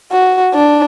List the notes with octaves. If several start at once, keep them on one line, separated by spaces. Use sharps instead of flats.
F#4
D4